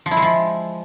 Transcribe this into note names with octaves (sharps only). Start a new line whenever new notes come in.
F3
E4
G#3
F3